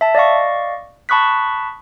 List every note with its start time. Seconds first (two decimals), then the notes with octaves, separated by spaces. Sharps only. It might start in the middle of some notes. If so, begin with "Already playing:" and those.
0.01 E5 A5
0.15 D5 D#5 F5 C#6
1.09 A5 B5 C#6 D#6 F#6 B6